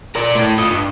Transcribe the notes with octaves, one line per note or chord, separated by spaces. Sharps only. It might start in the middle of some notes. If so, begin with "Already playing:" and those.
A#4 D5
A2
F4 D#5
G2